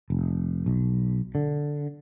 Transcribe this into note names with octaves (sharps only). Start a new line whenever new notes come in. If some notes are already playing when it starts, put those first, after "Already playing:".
F1
B1
D3